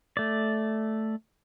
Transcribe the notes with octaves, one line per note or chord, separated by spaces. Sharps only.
A3 D5